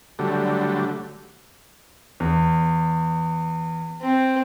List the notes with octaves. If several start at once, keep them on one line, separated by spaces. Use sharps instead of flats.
D3 F#3 G3 A3
E2
C4